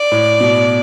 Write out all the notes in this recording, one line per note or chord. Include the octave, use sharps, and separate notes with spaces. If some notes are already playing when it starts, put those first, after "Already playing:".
Already playing: D5
A2
B2